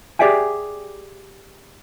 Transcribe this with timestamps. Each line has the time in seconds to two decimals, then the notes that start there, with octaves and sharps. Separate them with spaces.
0.19 G4 G#4 D5 E5 G5 G#5